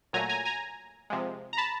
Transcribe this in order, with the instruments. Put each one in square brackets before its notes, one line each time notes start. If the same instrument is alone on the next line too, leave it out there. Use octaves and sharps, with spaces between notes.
[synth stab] A#2 F#3 A3 G#5 A#5
G#5 A#5
G#5 A#5
C3 F3 G#3
A#5
A5 B5